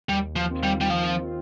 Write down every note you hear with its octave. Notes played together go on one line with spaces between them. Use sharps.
D#2 G3
F3
D#3 C4 F4
G3
G3
D#2 F3